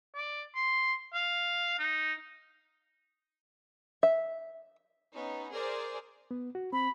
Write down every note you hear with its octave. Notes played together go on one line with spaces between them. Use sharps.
D5
C6
F5
D#4
E5
B3 C#4 D#4
G#4 A#4 C5 D5
B3
F#4
C4 B5